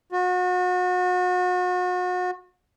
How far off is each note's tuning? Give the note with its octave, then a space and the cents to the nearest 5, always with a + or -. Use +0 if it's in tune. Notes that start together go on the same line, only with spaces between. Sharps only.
F#4 -35